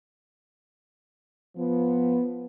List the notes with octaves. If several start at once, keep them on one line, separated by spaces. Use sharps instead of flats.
F3 B3